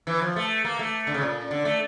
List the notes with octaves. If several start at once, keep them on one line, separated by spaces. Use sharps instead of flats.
E3
F3
A3
A#3
A3
D3
C#3
A#2
D3
A3